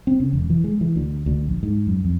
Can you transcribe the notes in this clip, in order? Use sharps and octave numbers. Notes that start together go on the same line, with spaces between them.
C4
C#3
E1
E3
G#3
E3
D2
D2
A#1
G#2
F#2
F2